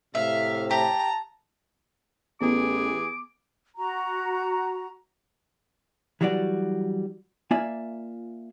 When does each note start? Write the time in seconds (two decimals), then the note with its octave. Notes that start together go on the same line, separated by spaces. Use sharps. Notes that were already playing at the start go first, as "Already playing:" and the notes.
0.15 A2 C3 E5 F5
0.71 G4 A5 A#5
2.41 A1 E3 B3 G4 G#4 D6
3.77 F#4 A#5
6.21 E3 F#3 G3 F#4 D5
7.51 A#3 F4 D5 E5 G#5